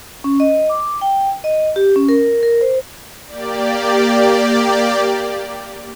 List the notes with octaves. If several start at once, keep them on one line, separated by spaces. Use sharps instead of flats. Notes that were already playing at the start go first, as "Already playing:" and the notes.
C#4
D#5
D6
G5
D#5
G4
C#4
A#4
A#4
C5
A#3 G4 D5